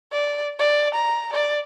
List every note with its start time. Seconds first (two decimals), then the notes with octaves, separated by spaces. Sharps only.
0.13 D5
0.59 D5
0.95 A#5
1.34 D5